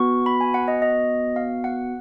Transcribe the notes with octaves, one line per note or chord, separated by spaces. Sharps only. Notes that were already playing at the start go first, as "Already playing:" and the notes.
Already playing: B3 F#4 C#6
B5
G#5
F#5
D#5
D#5
F5
F#5